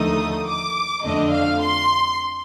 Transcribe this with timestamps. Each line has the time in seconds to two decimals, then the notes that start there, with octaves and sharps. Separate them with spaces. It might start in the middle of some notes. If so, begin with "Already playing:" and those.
Already playing: D#2 D3 F3 A3 D#4 D#6
0.46 D6
1.03 F2 D3 A3 D4 D#5
1.32 F5
1.62 C6